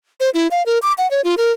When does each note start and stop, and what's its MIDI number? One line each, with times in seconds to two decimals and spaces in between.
0.20 0.30 72
0.34 0.48 64
0.51 0.63 77
0.66 0.78 70
0.82 0.93 86
0.98 1.09 78
1.11 1.21 73
1.24 1.35 65
1.38 1.52 70